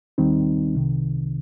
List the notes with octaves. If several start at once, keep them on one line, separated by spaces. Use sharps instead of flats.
D#2 D#3 G3 C4 D#4
C2 C3 D#3